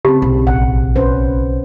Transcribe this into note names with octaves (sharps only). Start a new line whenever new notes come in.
C#3 C4 G4 A5 B5
B1
A1 F#5
C#4 B4 C5